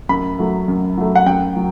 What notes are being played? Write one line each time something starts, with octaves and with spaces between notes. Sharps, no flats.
F#2 B5
F#3 A3
F#2
F#3 A3
F#5
F#2 G5
F#3